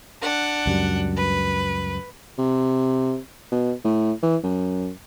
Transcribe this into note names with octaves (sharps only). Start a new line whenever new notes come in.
D4 F#5
C#2 F#2 G3
B4
C3
B2
A2
E3
F#2